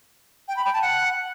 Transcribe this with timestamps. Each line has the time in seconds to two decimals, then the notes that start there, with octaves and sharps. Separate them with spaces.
0.48 G5
0.57 B5
0.65 G5
0.73 A5
0.82 F#5